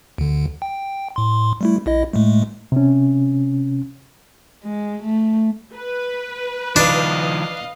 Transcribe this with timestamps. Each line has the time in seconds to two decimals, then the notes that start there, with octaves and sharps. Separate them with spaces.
0.18 D2 D3
0.62 G5
1.16 A2 C6
1.61 G3 A3 E4
1.86 A#1 E4 D#5
2.13 A2 G#3 A3
2.72 C3 C#4
4.63 G#3
5.02 A3
5.75 B4
6.76 D#3 F3 D4 D#5 F5